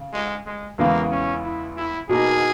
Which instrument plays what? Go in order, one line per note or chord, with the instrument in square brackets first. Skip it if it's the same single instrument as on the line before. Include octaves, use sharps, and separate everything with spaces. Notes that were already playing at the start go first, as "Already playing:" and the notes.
Already playing: [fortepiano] C#3
[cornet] G#3
G#3
[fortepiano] E2 C#3 E3 G#3 B3 [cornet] A#3
[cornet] C#4
E4
E4
[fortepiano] B2 A#3 D#4 A#4 [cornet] G#4